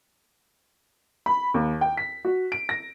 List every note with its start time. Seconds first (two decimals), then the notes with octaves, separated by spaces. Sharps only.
1.26 B5
1.54 D#2
1.81 G5
1.97 B6
2.25 F#4
2.52 D7
2.69 A#6